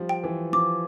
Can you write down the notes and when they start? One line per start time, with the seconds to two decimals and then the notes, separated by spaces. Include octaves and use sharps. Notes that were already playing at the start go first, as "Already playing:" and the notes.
Already playing: F3 G3
0.09 G5
0.24 E3
0.53 F3 D6